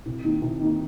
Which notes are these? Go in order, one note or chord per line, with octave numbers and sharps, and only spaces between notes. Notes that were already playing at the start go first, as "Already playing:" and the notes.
C3
D#3 A#3 D#4
C3
D#3 A#3 D#4